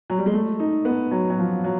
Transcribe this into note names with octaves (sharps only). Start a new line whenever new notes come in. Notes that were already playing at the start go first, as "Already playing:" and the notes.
F#3
G3
G#3
A3
D#4
B3
F#3
F#3
F3
F#3